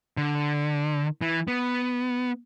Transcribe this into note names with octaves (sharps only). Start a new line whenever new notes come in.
D3
E3
B3